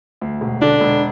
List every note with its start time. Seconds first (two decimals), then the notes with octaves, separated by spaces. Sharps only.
0.21 D2
0.41 E1
0.61 D3 D4
0.81 E1